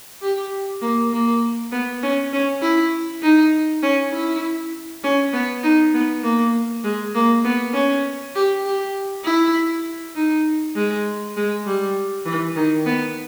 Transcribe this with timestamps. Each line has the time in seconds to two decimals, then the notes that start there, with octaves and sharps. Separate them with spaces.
0.22 G4
0.82 A#3
1.12 A#3
1.72 B3
2.03 C#4
2.33 C#4
2.62 E4
3.23 D#4
3.83 C#4
4.13 E4
5.04 C#4
5.33 B3
5.64 D#4
5.94 B3
6.24 A#3
6.85 G#3
7.15 A#3
7.44 B3
7.74 C#4
8.35 G4
8.66 G4
9.25 E4
10.16 D#4
10.76 G#3
11.37 G#3
11.66 G3
12.26 E3
12.56 D#3
12.86 B3